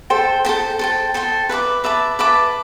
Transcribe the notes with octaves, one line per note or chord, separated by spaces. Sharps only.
A4 C5 G5
A4 C5 G5
A4 C5 G5
A4 C5 G5
B4 E5 A5 D6
B4 E5 A5 D6
B4 E5 A5 D6